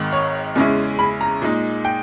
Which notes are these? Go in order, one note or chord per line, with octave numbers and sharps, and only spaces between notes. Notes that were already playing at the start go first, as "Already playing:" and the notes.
Already playing: G#1 G#2 D#3
C#5
E2 C#3 G#3 C#4 E4
B5
A#5
A#2 G#3 D#4
G5